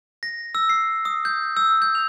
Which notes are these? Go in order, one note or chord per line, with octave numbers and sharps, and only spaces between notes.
A#6
E6
C7
D#6
G6
E6
G6
F7